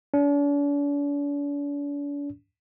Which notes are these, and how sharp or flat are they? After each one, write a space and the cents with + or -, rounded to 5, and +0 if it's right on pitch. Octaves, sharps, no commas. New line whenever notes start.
D4 -45